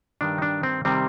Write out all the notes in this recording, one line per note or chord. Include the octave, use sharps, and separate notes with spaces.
G2 D#3 G3 D4
D#4
D4
C4
C3 D#3 G3 C4